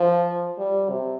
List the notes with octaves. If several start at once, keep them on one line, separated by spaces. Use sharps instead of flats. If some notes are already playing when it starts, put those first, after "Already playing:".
Already playing: F3
G3
C3